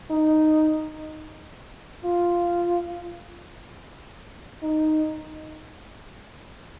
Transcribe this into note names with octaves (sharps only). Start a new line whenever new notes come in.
D#4
F4
D#4